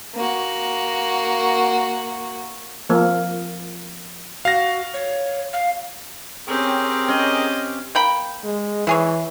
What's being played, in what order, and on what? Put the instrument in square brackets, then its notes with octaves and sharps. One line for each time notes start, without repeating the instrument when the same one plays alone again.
[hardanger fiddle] A#3 F#4
[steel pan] F3 A#3
[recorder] F#4 [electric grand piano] F5 A#6
[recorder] C#5
F5
[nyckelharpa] C4 G4 [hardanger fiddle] C#4 C#5 [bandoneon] G#4 A#4 G5
[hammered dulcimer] C#4 [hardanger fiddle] D#5
[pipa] A#3 G5 B5
[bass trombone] G#3
[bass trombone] E3 [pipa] E4 G#4 C#5